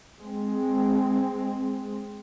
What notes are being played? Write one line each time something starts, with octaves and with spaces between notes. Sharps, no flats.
G#3 C4